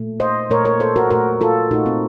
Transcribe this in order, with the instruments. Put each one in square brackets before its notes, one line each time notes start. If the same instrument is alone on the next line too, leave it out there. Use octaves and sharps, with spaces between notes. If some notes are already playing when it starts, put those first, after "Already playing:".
Already playing: [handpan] A#2 A3
C5 D#5
A#2 A3 A#4 C#5
A#4 C#5
A4 C5
F#4 A#4
A#2 A3 F#4 A#4
F4 A4
A#2 A3 D#4 F#4
C4